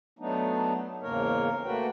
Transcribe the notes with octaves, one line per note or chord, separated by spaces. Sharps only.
F#3 A3 B3 D4 D#4
E2 G#2 C#3 A#3 A#4 C#5
A3 A#3 F#4 B4 G5